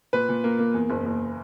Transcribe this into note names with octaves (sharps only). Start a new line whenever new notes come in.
A#2 B4
A#2
A#3
A#3
E2
F#1
F#1